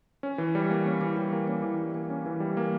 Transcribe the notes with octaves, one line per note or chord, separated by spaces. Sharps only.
C#4
E3
G3
A#3
C#4
E3
G3
A#3
C#4
E3
G3
A#3
C#4
E3
G3
A#3